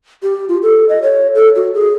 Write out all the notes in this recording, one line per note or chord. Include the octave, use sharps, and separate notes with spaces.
G4
F4
A4
D#5
C#5
A4
F#4
G#4